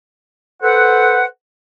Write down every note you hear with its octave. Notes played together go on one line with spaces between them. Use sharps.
A4 B4 C5 F#5